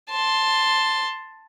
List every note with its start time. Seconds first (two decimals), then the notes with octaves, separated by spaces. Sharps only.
0.10 A5 C6